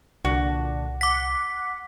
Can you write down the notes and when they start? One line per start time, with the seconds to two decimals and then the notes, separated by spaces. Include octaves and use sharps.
0.25 C2 A#2 D3 D4 F#4
1.01 F#5 D6 B6